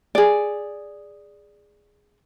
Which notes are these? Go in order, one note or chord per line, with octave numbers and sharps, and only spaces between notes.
G#4 D5